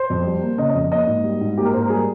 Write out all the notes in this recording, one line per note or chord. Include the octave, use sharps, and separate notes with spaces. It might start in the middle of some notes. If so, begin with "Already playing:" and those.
Already playing: C5
F2
G3
A#3
C#3 D#5
D#5
F2
A#3 D#5
G#2
G3
G#2
A#3 G4
A#4
G#2 C5
A#4
G3 G#4